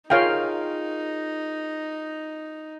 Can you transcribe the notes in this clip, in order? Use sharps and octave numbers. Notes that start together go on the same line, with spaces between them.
D#4 F4 G#4 A#4 C#5 F5 G5